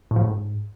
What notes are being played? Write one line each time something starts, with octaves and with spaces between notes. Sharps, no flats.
A2
F3
A2
G#2